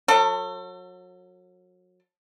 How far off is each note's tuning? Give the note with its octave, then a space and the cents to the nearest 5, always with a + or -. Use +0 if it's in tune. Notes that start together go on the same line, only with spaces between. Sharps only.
F#3 -30 A4 +35